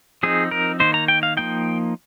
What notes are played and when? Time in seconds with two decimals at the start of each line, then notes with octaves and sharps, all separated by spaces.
0.23 F3 C4 D#4 G#4
0.51 A#4
0.80 D#3 A#3 D#4 C5
0.94 A#5
1.08 G5
1.23 F5
1.37 F3 A#3 D#4 G5